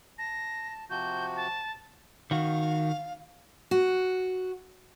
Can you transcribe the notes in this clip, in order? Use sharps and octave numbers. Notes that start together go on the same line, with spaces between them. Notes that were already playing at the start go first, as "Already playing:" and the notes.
A5 A#6
C3 F3 F#4 G6
A5
D#3 F#4 F5
F#4